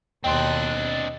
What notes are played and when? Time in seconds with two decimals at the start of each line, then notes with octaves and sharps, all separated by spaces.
0.24 D#2 B2 C4 D4 D#5 G5 C6 F#6